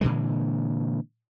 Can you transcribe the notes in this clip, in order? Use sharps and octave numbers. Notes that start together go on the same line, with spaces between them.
A#2 D3 E3 G#3